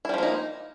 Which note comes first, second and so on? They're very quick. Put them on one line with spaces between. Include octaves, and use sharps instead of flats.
E4 G3 F3 A#3 D#4